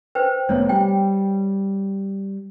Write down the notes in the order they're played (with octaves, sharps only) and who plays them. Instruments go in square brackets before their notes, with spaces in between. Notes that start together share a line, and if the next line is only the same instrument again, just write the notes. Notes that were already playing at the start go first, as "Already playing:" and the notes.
[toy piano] B4 C5 G5
[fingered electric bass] F1 A3 B3 [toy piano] C#5
[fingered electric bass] G3 [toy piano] G5